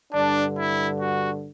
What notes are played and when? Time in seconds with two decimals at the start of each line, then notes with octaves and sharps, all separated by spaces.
0.13 G2 D3 D4
0.57 E4
0.99 F#4